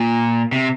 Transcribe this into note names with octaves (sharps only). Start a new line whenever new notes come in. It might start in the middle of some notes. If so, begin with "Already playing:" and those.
Already playing: A#2
C3